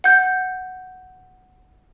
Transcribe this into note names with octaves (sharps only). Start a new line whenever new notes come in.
F#5 G6